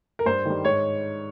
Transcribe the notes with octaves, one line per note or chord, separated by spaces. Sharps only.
A#4
G2 C5
D#3 G3
G#2 C#5